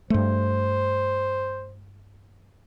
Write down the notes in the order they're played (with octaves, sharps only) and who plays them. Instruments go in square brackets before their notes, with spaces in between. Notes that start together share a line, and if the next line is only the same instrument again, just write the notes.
[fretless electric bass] G2 A3 [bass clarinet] C5